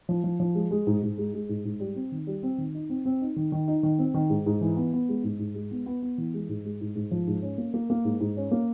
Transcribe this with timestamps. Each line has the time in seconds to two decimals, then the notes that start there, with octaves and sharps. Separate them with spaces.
0.09 F3
0.24 F3
0.40 F3
0.55 G#3
0.71 G#3
0.87 G#2
1.02 G#2
1.18 G#3
1.34 G#3
1.49 G#2
1.65 G#2
1.80 G3
1.96 C4
2.12 D#3
2.27 G3
2.43 C4
2.58 D#3
2.75 D#4
2.90 C4
3.05 C4
3.21 D#4
3.36 D#3
3.52 D#3
3.68 D#4
3.83 D#3
3.99 C4
4.14 D#3
4.30 G#2
4.46 G#2
4.61 E3
4.77 B3
4.93 B3
5.09 G#3
5.24 G#2
5.39 G#2
5.55 G#3
5.71 B3
5.86 B3
6.02 B3
6.18 E3
6.34 G#3
6.49 G#2
6.65 G#3
6.81 G#2
6.95 G#2
7.11 F3
7.27 G#2
7.42 C#4
7.58 A#3
7.74 A#3
7.90 A#3
8.05 G#2
8.20 G#2
8.37 C#4
8.51 A#3